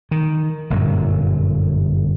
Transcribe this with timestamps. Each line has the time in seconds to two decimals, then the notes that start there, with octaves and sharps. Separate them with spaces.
0.11 D#3
0.70 G1 F#2 A#2 F#3